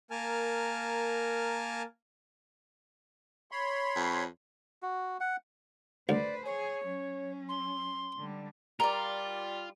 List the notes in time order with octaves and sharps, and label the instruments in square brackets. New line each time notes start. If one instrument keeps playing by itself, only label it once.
[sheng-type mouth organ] A#3 A#4 G#5 A5 F6
[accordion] C#5 B5 C6
[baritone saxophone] F2
[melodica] F#4
F#5
[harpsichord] D2 [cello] B4 C5 [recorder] D5
[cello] G#4 [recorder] C#5
[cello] F#3 C#4
[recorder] C6
[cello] D3 G3
[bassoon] G3 [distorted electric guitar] F4 [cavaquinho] A#4 D5 [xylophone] A#5